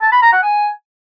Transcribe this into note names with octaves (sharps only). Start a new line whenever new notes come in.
A5
B5
A#5
F#5
G#5